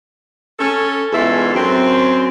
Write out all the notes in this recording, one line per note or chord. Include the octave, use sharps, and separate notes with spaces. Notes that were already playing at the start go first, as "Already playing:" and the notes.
C#4 A4
E2 G#2 F4 A4 E5
F#2 C4